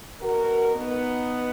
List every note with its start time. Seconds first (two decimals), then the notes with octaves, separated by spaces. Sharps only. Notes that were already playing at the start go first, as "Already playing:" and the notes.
0.20 B2 F#4 A#4
0.74 B3 D#4